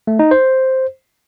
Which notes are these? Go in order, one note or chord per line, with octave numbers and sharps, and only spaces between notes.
A3
D#4
C5